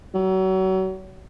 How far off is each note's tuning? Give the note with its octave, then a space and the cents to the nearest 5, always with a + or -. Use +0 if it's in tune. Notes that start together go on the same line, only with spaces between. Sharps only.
F#3 +35